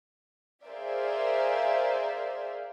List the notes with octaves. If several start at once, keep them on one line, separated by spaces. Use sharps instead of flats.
G#4 A#4 C5 D5 E5 F5